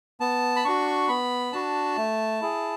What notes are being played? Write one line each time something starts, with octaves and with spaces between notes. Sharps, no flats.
B3 A5
B5
D4 F#4 C#6
B3 B5
D4 F#4 A5
A3
E4 G#4